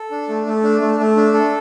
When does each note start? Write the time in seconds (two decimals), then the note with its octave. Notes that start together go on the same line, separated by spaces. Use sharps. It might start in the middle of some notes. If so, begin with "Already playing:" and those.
Already playing: A4
0.11 D4
0.29 A3
0.47 A3
0.63 D4
0.81 A3
1.00 A3
1.17 D4
1.34 A4